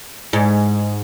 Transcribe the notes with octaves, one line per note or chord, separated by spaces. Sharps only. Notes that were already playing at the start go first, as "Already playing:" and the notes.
G#2